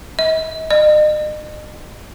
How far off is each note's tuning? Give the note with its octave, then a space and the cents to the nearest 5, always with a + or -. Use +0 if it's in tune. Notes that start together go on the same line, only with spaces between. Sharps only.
D#5 +45
D#5 -40